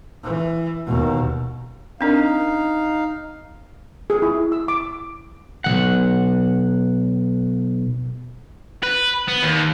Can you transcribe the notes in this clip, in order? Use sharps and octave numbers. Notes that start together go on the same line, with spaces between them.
E3
D#2 B2
C4 D4 D#4 A#4 F5
G#4
E4
E6
D6
B1 D#3 F#5
B4
B3
D#2